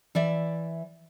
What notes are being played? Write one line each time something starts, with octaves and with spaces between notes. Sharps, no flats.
E3 D5 E5